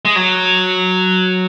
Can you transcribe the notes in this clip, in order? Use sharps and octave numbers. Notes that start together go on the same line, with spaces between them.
G#3
F#3